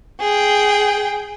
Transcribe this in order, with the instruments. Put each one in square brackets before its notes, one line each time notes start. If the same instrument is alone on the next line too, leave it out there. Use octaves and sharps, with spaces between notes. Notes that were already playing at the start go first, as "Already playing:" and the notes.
[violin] G#4 G5